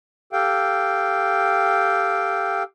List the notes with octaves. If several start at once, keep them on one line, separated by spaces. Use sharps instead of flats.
G4 A4 F5 G5